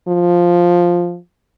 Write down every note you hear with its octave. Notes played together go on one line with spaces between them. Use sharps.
F3